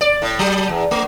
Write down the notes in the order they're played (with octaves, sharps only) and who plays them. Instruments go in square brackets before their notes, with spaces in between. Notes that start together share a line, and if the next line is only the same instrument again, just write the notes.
[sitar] D5
A2
F#3
E2
A3